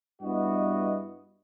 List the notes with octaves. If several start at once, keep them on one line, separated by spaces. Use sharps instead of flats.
G2 B3 E4 F#4 D#5